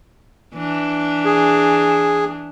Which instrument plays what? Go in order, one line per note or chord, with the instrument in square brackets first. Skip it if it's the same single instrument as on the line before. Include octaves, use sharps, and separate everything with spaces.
[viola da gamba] E3 D4
[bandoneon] G#4